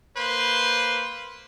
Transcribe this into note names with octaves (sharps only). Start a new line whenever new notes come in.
A#3 B4 C5 C6